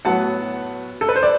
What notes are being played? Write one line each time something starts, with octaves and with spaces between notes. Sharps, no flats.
A2 F#3 B3 F#5 A5
A4
B4
C5
D5